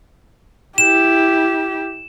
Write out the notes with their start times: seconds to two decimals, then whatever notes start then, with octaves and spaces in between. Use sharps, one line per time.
0.78 E4 G4 E7